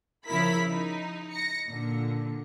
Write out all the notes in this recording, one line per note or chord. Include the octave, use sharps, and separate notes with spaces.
C#3 F3 E4 A#4 B5 B6
D#4
A#6 C#7
A#2 D3